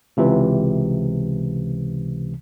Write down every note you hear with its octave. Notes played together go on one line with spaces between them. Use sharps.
C#2 C3 E3